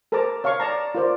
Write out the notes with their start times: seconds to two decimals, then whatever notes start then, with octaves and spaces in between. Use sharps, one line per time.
0.12 A4 A#4 C5 A5 A#5 D6
0.44 C#5 F5 A5 C#6
0.60 D5 A5 A#5
0.95 F4 A#4 C5 D5